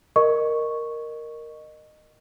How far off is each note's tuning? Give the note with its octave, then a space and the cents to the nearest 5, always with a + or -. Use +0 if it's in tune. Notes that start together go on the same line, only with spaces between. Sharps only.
A#4 +0 D#5 -20 C#6 +0